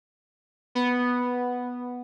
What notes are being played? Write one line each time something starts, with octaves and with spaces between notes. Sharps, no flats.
B3